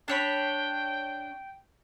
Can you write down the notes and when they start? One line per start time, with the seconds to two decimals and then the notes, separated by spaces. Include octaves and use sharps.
0.08 D4 C#5 G5 B5